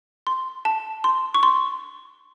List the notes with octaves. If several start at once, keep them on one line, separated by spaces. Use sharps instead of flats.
C6
A5
C6
C#6
C6